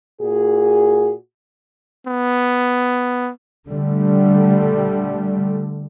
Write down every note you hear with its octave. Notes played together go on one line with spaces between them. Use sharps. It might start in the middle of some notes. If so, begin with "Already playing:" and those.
A#2 F#4 G#4
B3
D3 G3 A3